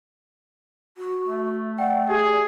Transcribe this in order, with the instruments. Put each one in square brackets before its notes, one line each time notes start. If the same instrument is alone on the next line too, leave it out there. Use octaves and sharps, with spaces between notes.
[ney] F#4
[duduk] A3
[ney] D5 [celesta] F#5 G5
[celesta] G4 [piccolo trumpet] G#4